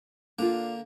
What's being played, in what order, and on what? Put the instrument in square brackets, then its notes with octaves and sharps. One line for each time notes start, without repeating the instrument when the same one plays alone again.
[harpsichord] D3 A#3 A#5 [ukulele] D4 F4